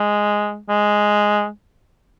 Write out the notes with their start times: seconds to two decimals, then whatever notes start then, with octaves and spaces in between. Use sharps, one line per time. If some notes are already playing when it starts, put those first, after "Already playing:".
Already playing: G#3
0.69 G#3